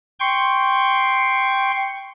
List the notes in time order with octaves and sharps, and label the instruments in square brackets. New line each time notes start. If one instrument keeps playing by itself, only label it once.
[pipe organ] G5 C6 C#6